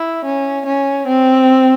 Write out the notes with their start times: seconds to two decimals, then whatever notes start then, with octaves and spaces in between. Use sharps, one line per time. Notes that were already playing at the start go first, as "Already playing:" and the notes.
Already playing: E4
0.25 C#4
0.66 C#4
1.07 C4